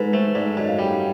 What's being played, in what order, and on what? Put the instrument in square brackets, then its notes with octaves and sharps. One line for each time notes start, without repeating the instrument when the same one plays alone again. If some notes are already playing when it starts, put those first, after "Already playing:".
Already playing: [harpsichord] G#2 [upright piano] A4 B4
[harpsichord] A3 [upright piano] C5
[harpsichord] G#2 [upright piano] D5
[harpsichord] F#2 [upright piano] D#5
[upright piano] F5
[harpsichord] G3 [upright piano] G5
[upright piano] F#5